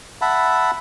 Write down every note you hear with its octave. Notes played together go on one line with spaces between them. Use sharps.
E5 F#5 A5 B5